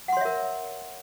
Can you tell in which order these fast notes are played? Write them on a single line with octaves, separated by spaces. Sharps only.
F#5 C6 C#5 E5 A#4